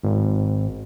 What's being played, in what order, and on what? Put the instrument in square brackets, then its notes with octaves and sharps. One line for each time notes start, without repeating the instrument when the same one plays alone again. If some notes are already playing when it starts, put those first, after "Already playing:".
[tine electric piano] G#1